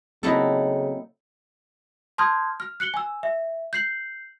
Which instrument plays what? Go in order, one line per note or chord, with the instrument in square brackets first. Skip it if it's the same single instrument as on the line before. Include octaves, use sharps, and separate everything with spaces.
[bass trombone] C#3 [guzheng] F#3 A3 [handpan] A#3 C4 [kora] D#4 E4 A4
[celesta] A5 C6 D#6 F6 G6 G#6
F6
F#6 C#7 F#7 G7
G#5 E6
E5
G6 C7 F#7